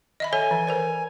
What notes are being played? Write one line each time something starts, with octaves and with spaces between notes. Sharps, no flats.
D#5 E5 B5
A4 C#5 E5 G#5
E3
A#4 C5 D5